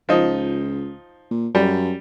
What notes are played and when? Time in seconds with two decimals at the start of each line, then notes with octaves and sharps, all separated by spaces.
0.09 C#2 F3 D#4
1.31 A#2
1.55 F#2 G3